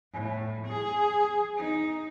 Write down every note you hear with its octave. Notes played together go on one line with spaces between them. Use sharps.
A2
G#4
D#4